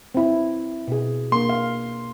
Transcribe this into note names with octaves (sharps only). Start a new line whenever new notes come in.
C4 E4
B2 G#4
A#3 D4 C6
F5